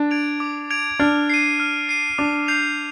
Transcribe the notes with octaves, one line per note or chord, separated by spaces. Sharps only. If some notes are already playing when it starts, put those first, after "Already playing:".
Already playing: D4
G#6 D7 F7
D6
G#6 D7 F7
D4 F6
C7 D#7
F6
C7 D#7
D4 D6
G6 C7 F7